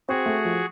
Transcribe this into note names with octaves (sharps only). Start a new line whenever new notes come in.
C4 F#4 G#4
A3
F3